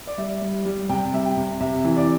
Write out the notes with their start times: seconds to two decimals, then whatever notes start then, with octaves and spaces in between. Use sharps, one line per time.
0.07 D5
0.18 G3 E5
0.42 G3
0.65 G3
0.89 C3 G5
1.13 G3 E5
1.25 G5
1.37 C3
1.61 C3 E5
1.84 E3
1.97 D5